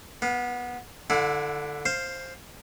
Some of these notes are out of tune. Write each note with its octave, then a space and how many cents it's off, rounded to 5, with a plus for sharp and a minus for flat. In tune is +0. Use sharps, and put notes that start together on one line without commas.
B3 -15 F5 +30
D3 +5 E4 +5 F#5 -45
C5 +10 F5 +0